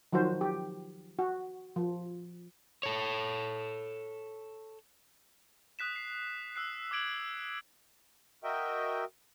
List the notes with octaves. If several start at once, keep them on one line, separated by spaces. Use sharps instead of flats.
D#3 F3 F#3 F#4 C5
G4
F#4
F3
A4 C#5
D#6 F#6 B6 E7
C7
E6 F#6 C7
D6 E6 G#6 D7 F#7
F#4 A#4 D#5 E5 G5